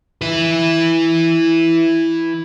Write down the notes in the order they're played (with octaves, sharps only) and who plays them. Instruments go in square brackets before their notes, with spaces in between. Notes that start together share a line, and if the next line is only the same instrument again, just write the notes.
[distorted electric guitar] E4 B4